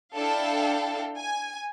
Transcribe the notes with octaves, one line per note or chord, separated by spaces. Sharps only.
D4 E4 A4 F5 G5
G#5